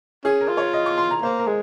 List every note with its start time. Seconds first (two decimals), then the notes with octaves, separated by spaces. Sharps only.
0.24 C#4 G#4
0.41 A#4
0.49 F4
0.57 C#5
0.73 D#5
0.86 C#6
0.98 C6
1.11 A#5
1.22 A#3 C5
1.39 A#4
1.47 G#3